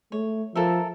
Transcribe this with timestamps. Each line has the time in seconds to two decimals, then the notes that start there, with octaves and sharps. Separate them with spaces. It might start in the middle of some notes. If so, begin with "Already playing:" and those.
0.12 A3 C#5
0.56 F3 A4 A#4 E5